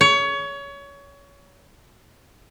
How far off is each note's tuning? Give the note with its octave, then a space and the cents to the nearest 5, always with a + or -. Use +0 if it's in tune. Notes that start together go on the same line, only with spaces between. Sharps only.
C#5 +25